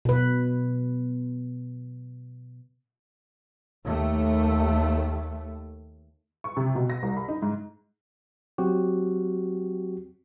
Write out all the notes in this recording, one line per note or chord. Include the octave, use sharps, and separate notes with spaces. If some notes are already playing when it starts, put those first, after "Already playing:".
B2 B4
D#2 A3
C#6
C3
B2
A#6
C2
B5
D#4
G#2
F#3 C4 F#4 G4